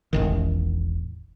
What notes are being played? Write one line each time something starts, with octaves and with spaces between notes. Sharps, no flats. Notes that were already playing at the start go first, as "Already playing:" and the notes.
E1 A1 D#3